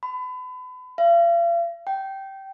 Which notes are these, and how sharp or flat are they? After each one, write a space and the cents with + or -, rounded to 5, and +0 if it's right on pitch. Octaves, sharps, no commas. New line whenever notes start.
B5 +35
F5 -40
G5 -15